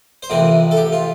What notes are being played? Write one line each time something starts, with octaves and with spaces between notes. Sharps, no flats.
C5
F2 C3 E3 A#4
A4
G4
F4